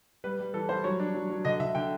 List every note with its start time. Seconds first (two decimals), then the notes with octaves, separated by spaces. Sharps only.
0.24 G3 B4
0.40 G3
0.54 E3 A4
0.69 G3 C5
0.84 F#3 C#5
1.00 D4
1.14 F#3
1.30 F#3
1.45 D3 D#5
1.60 D3 E5
1.75 D3 G5